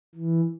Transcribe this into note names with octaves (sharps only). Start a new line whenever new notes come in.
E3